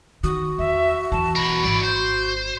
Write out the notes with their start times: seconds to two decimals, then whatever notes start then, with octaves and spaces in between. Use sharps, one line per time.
0.24 D#3 F#4 D#6
0.58 E2 E5
1.12 E2 E3 A5
1.35 B2 A#4 B5
1.64 G#1 E4 D5
1.83 C5 G6